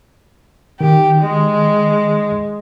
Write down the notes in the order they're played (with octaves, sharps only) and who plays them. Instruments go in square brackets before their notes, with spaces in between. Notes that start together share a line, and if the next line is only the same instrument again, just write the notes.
[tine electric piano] D#3 [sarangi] G4
[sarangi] G#3